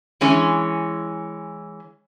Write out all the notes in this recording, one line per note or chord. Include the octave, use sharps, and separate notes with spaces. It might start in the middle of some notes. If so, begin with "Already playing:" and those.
E3 G#3 C#4